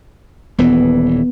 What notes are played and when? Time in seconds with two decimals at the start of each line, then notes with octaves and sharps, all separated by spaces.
0.59 D#1 E3 B3